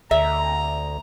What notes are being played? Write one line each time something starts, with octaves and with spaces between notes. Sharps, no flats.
D2 E5 A#5